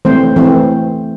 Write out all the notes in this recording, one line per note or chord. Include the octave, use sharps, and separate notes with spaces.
E3 A3 C4 C5
E3 A3 C4